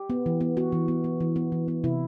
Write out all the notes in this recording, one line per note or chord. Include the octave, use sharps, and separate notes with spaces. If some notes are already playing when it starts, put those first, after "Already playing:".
Already playing: G4
B3
E3
B3
B3 F#4
E3
B3
B3
E3
B3
E3
B3
C3 E4